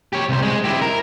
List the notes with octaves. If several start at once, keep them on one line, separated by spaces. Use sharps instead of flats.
G4 C#5
C2 C5
G#3
E4 G4
A#4